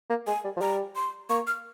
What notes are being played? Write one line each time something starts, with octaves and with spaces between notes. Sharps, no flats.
A#3
G#3 G#5
G3
F3
G3 A#5
C6
A#3 C#6
F6